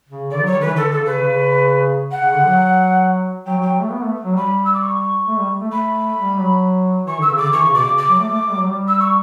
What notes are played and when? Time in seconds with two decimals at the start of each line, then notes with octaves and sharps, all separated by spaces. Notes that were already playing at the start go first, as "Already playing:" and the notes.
0.09 C#3
0.31 D3 D5
0.43 F#3 C#5
0.54 G3
0.60 D3 E3 B4
0.76 D3 A4
0.91 A4
0.98 C#3
1.05 B4
1.22 C#3
2.11 F#5
2.22 C#3
2.33 D3
2.45 F#3
3.46 F#3 G5
3.58 F#3
3.61 G5
3.68 F#3
3.80 A3
3.92 B3
4.03 A3
4.25 F#3
4.36 G3 B5
4.65 E6
4.73 D6
4.82 C#6
5.27 A3
5.38 G3
5.61 A3
5.71 A3 B5
6.17 G3
6.40 F#3
7.06 E3 C#6
7.19 D3 E6
7.29 C#3
7.37 D3 D6
7.52 E3 C#6
7.63 C#3
7.74 B2 D6
7.86 C#3
7.97 D6
8.08 F#3
8.20 A3
8.31 A3
8.42 A3
8.50 G3
8.58 F#3
8.68 G3
8.88 E6
8.99 C#6